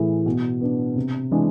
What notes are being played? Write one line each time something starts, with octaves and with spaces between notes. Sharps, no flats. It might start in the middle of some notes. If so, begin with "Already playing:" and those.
Already playing: A2 E3 A3 E4 G#4
B2
B3 D4
C3
E3 G#3 D4